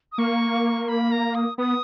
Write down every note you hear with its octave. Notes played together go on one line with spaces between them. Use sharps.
D#6
A#3 C#6
B5
A#5
D#6
B3 D#6